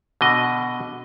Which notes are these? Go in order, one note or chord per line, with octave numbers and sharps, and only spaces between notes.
B2 D3 D#5